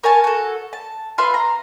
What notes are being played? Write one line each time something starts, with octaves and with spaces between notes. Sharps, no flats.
A#4 C#5 G#5 A5
F#4 A4
A5
F4 B4 E5 C6
A#5